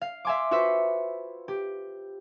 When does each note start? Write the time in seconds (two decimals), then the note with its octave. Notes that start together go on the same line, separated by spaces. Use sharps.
0.01 F5
0.25 E5 F5 G#5 C6 D6
0.51 F4 F#4 B4 C5 E5
1.48 G4